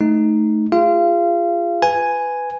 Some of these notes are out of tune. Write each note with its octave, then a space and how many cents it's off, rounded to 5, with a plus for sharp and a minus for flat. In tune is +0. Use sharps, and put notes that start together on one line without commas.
A3 -10 D#4 +0
F4 -20 G#4 -25 F5 -30
B4 +15 G#5 +0